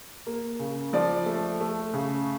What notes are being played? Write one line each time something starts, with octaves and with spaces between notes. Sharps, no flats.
A#3
C#3
F3 D5
A3
A3
C#3